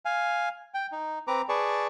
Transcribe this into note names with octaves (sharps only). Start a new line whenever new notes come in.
F5 G#5
G5
D#4
C4 B4 A#5 D6
G#4 B4 D5 A5 C#6